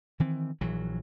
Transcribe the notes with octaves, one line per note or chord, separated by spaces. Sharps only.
D#3 E3 C4
A#1 E3 F#3